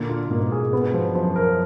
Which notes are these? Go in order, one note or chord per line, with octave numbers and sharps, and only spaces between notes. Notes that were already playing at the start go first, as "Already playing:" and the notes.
Already playing: A#2 D3 A#3
F4
G#2 B2 A#3
G#4
G#2 B2 B3
F3
F#2 F3
A#4